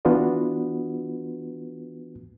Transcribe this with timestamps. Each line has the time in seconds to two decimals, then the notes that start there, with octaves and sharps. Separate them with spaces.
0.05 E3 B3 D4 F4 F#4 B4